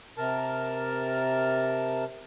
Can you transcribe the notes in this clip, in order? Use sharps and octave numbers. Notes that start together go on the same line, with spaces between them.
C3 A#4 A5